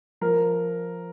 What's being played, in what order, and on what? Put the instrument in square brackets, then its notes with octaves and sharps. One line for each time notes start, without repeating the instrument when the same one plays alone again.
[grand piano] F3 A#4